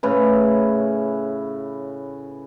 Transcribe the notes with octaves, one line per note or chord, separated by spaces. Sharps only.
A2 C#3 B4